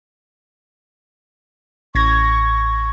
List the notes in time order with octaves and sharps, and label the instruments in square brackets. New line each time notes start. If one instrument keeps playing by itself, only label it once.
[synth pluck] A1 G#6 A#6 [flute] C#6